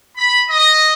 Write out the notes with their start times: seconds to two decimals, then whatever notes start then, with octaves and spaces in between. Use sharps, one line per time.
0.17 B5
0.47 D#5